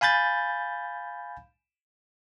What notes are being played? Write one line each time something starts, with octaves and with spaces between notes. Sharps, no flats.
F5 G#5 B5 G6 A6